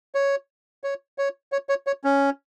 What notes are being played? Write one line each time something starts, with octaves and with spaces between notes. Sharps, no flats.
C#5
C#5
C#5
C#5
C#5
C#5
C#4